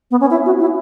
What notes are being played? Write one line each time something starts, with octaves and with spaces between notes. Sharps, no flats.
B3
C#4
E4
F#4
E4